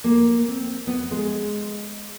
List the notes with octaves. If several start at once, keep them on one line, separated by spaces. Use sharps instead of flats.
A#3
C4
B3
G#3